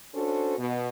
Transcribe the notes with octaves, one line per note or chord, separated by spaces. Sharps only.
C#4 D4 F#4 A4 C5
B2